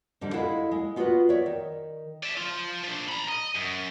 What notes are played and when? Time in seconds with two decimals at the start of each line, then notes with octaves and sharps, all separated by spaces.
0.21 G#2 D3 G3
0.33 G#3 E4 A4 F5 F#5
0.71 G#3
0.96 B3 F4 F#4 A#4 B4 F#5
1.29 C#5 D5 E5
1.46 D#3
2.24 D5 E5
2.37 F3 F4
2.83 F3 D4
3.08 A#5 B5
3.28 D#5
3.56 F#2